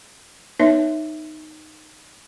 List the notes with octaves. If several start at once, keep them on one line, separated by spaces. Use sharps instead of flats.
B3 D#4 B4 C#5 E5